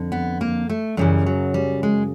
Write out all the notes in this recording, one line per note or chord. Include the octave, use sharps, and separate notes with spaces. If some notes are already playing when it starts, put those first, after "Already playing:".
Already playing: F2 D3
B3
A#3
A3
F#2 C#3 E3 G3
F#3
G3
G#3